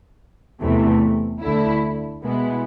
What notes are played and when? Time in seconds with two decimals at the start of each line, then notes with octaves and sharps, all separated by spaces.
0.61 E2 C3 E3 A3
1.41 D2 D3 A3 E4
2.22 B2 G#3 B3 E4